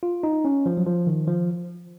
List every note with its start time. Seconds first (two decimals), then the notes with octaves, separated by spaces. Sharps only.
0.03 F4
0.23 D#4
0.45 C#4
0.66 F3
0.77 F#3
0.86 F3
1.07 D#3
1.27 F3